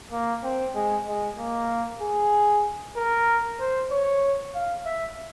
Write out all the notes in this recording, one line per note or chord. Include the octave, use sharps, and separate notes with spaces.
A#3
C4
G#3
G#3
A#3
G#4
A#4
C5
C#5
F5
E5